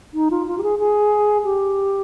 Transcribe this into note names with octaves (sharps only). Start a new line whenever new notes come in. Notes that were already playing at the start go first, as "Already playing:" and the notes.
D#4
F4
F4
G4
G#4
G#4
G4